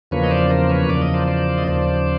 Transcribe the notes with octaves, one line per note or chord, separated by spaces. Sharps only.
E2 C#3 F3 A#3 B4 C#5
D#5
C5 D5
A#4 C5
B4 C#5
E2 C#3 F3 A#3 D5
D#5
C5 D5
C5 D5
D#5
D#2 C#3 F3 C5 D5